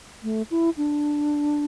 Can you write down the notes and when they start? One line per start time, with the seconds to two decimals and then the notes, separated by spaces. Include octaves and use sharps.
0.23 A3
0.51 E4
0.77 D4